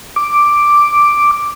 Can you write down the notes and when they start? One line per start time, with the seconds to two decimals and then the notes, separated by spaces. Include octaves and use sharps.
0.16 D6